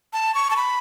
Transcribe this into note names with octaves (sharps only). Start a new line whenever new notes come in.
A5
C#6
A5
B5